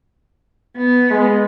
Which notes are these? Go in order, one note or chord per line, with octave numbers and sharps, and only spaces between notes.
B3
G#3